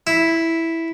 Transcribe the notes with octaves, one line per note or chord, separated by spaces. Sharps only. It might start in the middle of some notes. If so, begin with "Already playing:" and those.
E4